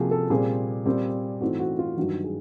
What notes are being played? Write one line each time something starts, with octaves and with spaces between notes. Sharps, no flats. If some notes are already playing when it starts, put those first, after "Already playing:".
Already playing: C3 F3 A#3 F#4 G#4
A4
A#2 G3 C4 G#4
A#2 G3 C4
G#2 E3 A3 C4 F#4
F#4
F4
G2 D#3 F#3 F#4
G#4